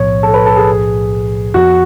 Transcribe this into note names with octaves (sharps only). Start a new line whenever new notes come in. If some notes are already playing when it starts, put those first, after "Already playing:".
Already playing: B1 A2 F3 B3 C#5
A4
B4
A4
G#4
F2 F3 B3 F#4